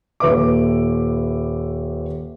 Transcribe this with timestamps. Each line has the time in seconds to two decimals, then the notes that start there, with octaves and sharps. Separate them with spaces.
0.20 D#1 B4 E5 D6